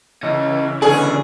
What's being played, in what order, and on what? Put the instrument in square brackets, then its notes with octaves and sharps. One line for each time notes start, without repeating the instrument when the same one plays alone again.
[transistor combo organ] C#3 E3 [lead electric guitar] C#4 D#5
[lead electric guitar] C#2 D5 [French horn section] B2 D3 C#4 [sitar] G#4